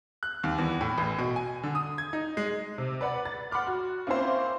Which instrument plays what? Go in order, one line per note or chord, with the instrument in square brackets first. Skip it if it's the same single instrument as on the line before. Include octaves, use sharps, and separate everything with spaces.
[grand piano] F#6
D#2
E2
A2
A1
B2
G#5
D3
D#6
G#6
D#4
G#3
[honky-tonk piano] C3
B4 D5 F#5 B5
A6
F#5 B5 C6 D6 F6
F#4
A#3 C4 C#4 E4 F4 C5